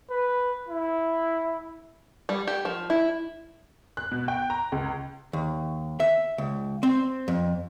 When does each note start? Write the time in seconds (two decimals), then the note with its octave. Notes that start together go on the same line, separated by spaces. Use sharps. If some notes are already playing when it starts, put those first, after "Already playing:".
0.10 B4
0.69 E4
2.29 G3
2.47 G4
2.65 F3
2.90 E4
3.97 F#6
4.12 B2
4.28 G5
4.50 A#5
4.72 C#2
5.33 D#2
6.00 E5
6.38 C#2
6.83 C4
7.28 F2